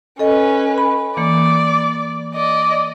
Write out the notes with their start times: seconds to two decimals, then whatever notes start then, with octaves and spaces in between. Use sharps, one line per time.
0.19 C#4 A4 B4 D#5
0.78 B5
1.17 E3 A#3 D5
2.35 D5 D#5